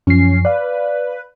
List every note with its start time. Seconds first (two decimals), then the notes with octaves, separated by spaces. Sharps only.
0.07 F#2 F3 C#4 C7
0.45 B4 D5 F5